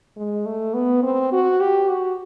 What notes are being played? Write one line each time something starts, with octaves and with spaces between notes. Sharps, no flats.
G#3
A3
B3
C4
F#4
G4
F#4